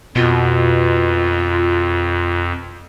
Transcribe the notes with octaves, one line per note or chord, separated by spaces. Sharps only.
F2 B2 F4